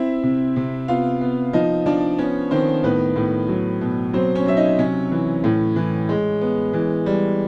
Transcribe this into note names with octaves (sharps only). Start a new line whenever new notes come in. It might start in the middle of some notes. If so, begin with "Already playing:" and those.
Already playing: C4 E4 E5
C3
C3
B3 F4 F5
B3
F3 D#4 D#5
F3 D4 D5
B3 C#4 C#5
D#3 C4 C5
A2 B3 B4
A2
F#3
B2
F#3 C4 C5
C#4 C#5
F#3 E5
D#4 D#5
C3 C#4 C#5
E3
A2
E3
G#3
B3
E3
G3